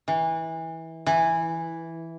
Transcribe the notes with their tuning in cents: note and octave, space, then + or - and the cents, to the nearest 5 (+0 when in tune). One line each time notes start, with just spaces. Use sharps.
E3 -20
E3 +0